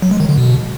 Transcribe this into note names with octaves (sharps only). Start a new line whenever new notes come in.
F#3
G#3
D#3
D3
B2